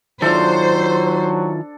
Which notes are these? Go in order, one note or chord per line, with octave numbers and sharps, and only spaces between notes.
D#3 F#3 D4 E4 F4 A4 C5